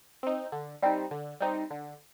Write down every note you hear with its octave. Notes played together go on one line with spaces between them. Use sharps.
C4 D#4
D3
G3 C4 D#4
D3
G3 C4 D#4
D3